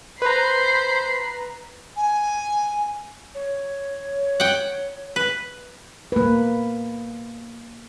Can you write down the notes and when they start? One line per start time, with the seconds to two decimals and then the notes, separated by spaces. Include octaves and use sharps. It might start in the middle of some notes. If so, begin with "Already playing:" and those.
0.22 B4 C5 A#5 B5 C7
1.96 G#5
3.35 C#5
4.40 F#5 G5
5.16 B4
6.12 A#3 B4